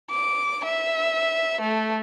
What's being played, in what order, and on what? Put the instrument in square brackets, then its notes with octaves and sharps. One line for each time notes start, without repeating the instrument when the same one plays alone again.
[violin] D6
E5
A3